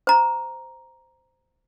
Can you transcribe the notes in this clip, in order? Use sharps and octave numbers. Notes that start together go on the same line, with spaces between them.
C5 A#5